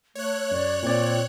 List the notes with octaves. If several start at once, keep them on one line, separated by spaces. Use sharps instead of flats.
A3 C#5 F#6
F#2 D5
A#2 C4 D5